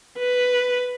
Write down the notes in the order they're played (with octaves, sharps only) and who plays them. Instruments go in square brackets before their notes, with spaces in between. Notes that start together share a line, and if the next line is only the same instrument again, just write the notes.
[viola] B4